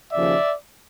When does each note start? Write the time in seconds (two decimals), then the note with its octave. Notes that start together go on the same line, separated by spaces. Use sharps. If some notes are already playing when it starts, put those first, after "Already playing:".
0.13 D#2 C#3 F3 D5 E5